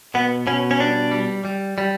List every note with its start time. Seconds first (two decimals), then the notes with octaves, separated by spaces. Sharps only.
0.14 B2 B3
0.47 B2 C#4
0.71 C#4
0.79 G3 D4
1.11 G3
1.45 G3
1.78 G3